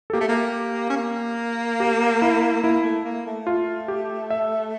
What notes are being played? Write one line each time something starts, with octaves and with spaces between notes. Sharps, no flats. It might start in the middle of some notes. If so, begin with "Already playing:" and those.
A4
A#3 G4
A3
A#3
C#4
A#3
G4
E4
A#3 E4
A3
A#3
A3
F4
G4
E5